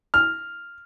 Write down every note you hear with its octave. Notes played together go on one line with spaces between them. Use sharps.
F6